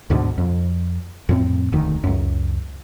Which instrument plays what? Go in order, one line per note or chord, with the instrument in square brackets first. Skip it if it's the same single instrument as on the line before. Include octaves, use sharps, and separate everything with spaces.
[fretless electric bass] D2 G#2 B2 D3
F2
F2 A2 C4
E1 D2 D#3
C#2 F#2